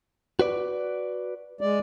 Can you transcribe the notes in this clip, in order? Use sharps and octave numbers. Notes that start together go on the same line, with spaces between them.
F#4 B4 D5
G#3 D5